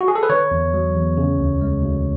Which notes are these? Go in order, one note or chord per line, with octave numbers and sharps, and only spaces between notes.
F#4
G#4
A4
B4
D3 C#5
E2
F#3
E2
C#3
D2
G#3
D2